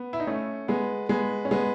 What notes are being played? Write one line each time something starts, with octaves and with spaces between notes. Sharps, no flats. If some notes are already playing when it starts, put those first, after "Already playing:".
Already playing: B3
E4
D#4
A3 C#4
G#3 B3
G#3 B3
C#4
G#3 B3